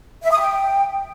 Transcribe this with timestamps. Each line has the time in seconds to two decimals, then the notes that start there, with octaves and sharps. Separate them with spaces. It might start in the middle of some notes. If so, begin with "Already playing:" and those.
0.24 E5
0.31 D#6
0.39 G5